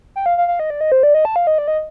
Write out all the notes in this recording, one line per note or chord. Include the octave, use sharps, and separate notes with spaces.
G5
F5
F5
F5
D#5
D5
D#5
C5
D5
D#5
A5
F5
D#5
D5
D#5